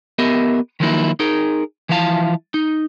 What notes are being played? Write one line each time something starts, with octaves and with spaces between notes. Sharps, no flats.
B3 G4 A#4 D#5 E5
D#3 F3 F#3 A#3 D#4 E4
D#4 G#4 A#4
E3 F3 E4 F5 A5
D#4